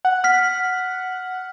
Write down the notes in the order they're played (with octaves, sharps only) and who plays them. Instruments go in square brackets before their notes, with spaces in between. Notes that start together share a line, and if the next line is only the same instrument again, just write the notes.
[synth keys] F#5
[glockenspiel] F6 B6